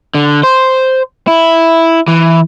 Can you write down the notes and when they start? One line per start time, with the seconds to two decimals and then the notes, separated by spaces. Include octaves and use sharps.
0.14 D3
0.43 C5
1.27 E4
2.08 E3